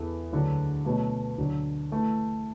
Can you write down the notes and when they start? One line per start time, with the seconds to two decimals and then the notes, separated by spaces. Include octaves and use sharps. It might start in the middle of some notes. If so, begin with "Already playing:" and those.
Already playing: E2 E3 B3 E4 A4
0.32 D2 D3 F#3 D4
0.85 B2 F#3 A3
1.38 D2 D3 F#3 D4
1.92 E3 A3 E4 A4